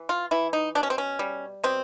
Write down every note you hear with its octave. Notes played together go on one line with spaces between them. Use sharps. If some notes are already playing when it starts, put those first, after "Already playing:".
Already playing: E3
F4
E3 E4
D#4
B2 D4
C#4
C4
C#4
G3
B2 C4